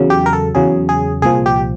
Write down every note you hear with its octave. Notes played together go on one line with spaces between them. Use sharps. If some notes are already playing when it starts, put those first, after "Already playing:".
Already playing: E2 C#3 F#3
G4
A#4
A4
E2 C#3 F#3 G#4
G#4
C2 A#2 F3 G#4
G4